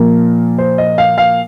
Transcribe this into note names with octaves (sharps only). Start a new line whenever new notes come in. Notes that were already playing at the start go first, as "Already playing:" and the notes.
Already playing: A#2 F3 A#3 A#4
C5
D#5
F5
F5